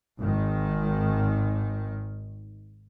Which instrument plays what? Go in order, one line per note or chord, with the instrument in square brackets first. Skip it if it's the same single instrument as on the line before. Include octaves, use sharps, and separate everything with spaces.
[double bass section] G#1 D#3